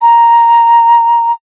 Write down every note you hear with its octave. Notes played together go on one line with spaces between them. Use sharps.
A#5